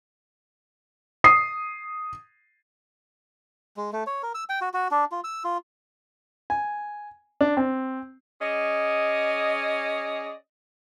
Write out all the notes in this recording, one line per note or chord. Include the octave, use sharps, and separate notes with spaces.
D#6 C7
G#3
A3
C#5
A#4
E6
G5
F#4
F#4
D4
F4
E6
F4
G#5
D4
C4
C#4 G#4 D5 D#5